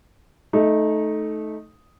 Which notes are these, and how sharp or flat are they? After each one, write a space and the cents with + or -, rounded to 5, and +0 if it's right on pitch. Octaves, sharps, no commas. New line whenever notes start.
A3 -15 D#4 +0